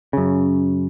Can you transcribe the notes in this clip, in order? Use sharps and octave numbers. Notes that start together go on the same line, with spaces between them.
F#2 C#3